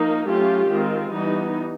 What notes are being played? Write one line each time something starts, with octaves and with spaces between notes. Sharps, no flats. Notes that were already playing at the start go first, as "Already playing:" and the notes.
Already playing: F3 A#3 D#4
F#3 A3 C#4 F4 G4
D#3 G#3 C4 F4
E3 G3 B3 D#4